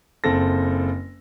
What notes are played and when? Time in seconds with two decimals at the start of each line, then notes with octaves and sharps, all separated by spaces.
0.24 F#1 C4 A4 A#6